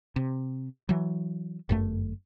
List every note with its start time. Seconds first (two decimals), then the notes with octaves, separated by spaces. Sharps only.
0.16 C3
0.89 E3 F#3
1.69 G1 F#2 A3